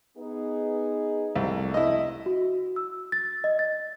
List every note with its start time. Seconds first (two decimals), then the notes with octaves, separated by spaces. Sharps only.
0.17 B3 D#4 G#4
1.36 C2 F2 C3 A3
1.74 E4 D#5
2.26 F#4
2.76 E6
3.12 A6
3.44 D#5
3.59 A6